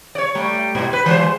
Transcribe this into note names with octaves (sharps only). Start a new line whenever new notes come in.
C#5 D5
G3 A3
G#2 B2
G4 B4
E3 G#3 C5